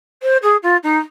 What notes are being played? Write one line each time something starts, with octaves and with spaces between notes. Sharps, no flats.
C5
G#4
F4
D#4